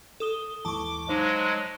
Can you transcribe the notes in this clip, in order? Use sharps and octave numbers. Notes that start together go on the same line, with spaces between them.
A4 D#6 G7
D#2 G#2 E3 A5 C#6 D6
F#3 G#3 D#4 C5 F5